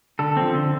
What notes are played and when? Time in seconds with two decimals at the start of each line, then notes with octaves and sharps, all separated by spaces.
0.19 D3 A4
0.37 F3 C4
0.54 D3